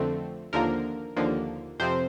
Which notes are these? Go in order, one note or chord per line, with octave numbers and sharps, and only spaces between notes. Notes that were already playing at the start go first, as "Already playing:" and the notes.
Already playing: F2 D3 A3 C4
D#2 D3 F3 A#3 A#4
D#2 D3 F3 A#3
F2 C3 F3 C4 C5